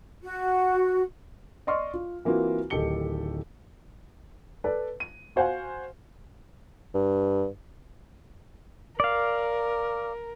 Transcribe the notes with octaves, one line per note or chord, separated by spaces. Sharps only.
F#4
D5 D#5 C6 C#6 F6
F4
E3 A#3 C4 F4 F#4
D1 D#3 G4 A4 C#7 G7
A4 B4 D5
D#7
F#4 C5 F5 F#5 G#5
G2
A#4 D5 F5